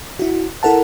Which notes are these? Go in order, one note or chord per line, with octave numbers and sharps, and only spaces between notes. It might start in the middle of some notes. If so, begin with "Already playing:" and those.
E4 F#4
E4 A4 A#4 F#5 A5